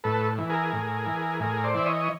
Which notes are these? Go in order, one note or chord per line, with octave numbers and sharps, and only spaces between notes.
A2 A4 B4
E3
G#4 A#4
A2
E3
A2 G#4 A#4
C5 D5
E3 E5
C#5 D#5